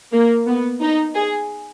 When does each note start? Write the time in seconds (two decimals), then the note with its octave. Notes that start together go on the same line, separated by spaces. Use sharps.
0.13 A#3
0.47 B3
0.81 D#4
1.15 G#4